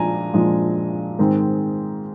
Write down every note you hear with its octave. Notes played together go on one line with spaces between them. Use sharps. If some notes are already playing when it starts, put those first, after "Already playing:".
Already playing: A#2 F3 G#3 D4 G#5 A#5
A#2 F3 G#3 D4
G#2 D#3 G#3 C4